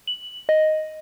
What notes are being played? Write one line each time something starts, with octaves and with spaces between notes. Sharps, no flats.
F#7
D#5